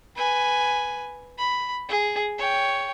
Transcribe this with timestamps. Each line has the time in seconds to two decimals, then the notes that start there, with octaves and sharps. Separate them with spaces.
0.16 B4 G#5
1.38 B5
1.89 G#4
2.38 C#5 G5